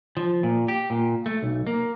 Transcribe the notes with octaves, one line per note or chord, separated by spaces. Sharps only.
F3
A#2
G4
A#2
A3
B1
A#3